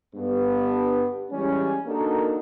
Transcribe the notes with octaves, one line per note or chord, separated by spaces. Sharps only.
G2 D3 B3
E3 G3 G#3 C#4
A#3 D4 D#4 F#4 A4 A#4